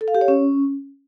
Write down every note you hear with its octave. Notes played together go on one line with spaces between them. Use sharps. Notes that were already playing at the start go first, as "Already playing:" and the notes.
A4
F5
G4
C#5
C#4